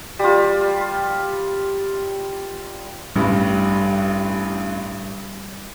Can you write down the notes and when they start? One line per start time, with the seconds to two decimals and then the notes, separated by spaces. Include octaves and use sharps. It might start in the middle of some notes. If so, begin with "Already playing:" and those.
0.19 G3 F4
3.16 A1 G2 G3